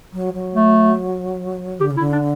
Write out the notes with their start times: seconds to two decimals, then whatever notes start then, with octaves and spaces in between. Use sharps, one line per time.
0.13 F#3
0.34 F#3
0.55 A3
1.80 D3 G4
1.91 C#3
1.97 D3 E4
2.13 D4